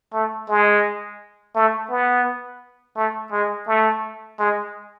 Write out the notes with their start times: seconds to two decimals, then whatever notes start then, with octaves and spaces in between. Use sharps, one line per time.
0.14 A3
0.49 G#3
1.55 A3
1.90 B3
2.97 A3
3.32 G#3
3.67 A3
4.39 G#3